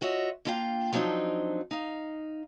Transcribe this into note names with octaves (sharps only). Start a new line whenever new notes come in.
F4 F#4 C#5 D#5 E5
A#3 D4 E4 F4 F5 G5
F3 F#3 C4 D4 D#4
D#4 F5